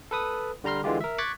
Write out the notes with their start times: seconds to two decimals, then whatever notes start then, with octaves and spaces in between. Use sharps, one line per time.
0.11 A4 B4 D#6
0.64 D3 G3 A#5 C6 F6
0.84 D3 E3 G#3 F4 G4
1.01 A#4 E5
1.18 C#6 D6 F#6 G#6 A6 B6